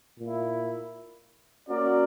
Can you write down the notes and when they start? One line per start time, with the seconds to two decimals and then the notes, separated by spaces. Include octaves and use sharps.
0.19 A#2 A#3 E4
1.67 A#3 C#4 F#4 A#4 D5